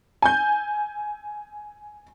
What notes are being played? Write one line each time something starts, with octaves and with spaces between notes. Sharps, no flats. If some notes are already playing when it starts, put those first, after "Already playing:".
G#5 G6